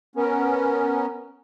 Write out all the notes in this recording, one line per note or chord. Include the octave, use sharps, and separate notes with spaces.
B3 C#4 A#4